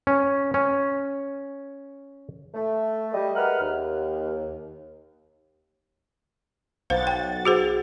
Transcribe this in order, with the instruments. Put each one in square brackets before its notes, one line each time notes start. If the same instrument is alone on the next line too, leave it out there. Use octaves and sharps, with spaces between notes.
[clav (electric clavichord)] C#4
C#4
[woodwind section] A3
G3 D#5
G#3 A#4 B4 E5 F#5 F6
D#2
[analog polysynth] B1 F#5 A6 [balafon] C5 F5
[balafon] G5
F#4 G#4 C5